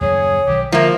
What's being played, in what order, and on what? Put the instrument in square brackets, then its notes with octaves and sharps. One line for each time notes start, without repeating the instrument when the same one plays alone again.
[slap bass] D#1 F#2 C#3 [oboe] G#4 [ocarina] C#5
[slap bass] B1 D#3 F#3 [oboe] G4
[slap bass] D3 G#3 [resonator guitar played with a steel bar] F3 A#3 [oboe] A#4 [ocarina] E5